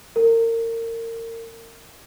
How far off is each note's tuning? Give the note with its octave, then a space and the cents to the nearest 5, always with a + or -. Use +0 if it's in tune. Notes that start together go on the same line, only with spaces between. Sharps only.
A#4 -30